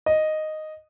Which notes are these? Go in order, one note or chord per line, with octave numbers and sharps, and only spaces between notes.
D#5